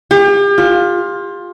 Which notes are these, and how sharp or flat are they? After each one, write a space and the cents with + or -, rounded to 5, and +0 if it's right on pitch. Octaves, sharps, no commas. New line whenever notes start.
G4 +40
F4 +15